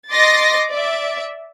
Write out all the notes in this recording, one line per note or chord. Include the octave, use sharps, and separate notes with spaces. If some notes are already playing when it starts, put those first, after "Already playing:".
D#5 C6 D6 A6 A#6 C7
D5 E5